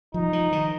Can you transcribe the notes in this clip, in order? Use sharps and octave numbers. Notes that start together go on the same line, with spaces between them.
F3 D#4
F3
D#3